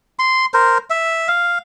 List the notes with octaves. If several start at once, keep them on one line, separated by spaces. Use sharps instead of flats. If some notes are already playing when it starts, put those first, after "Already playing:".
C6
A#4 C5
E5
F5